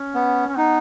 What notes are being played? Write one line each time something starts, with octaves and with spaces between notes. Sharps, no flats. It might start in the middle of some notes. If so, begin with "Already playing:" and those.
Already playing: C#4
B3
C#4
B3 D#4